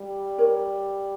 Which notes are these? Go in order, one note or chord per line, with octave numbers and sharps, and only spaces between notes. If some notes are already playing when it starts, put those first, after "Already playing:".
Already playing: G3
A#4 C#5